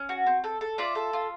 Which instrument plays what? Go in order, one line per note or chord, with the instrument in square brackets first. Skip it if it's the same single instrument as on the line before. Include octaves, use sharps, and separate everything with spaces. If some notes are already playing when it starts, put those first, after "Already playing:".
Already playing: [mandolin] C#4
F#4
C4
A4
A4
F4 D5 E5
A4
F4